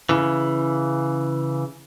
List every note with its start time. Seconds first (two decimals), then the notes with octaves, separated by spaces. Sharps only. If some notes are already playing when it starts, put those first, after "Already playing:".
0.09 C#3 E3